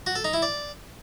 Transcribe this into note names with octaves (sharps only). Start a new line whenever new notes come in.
F#4
A4
D#4
E4
D5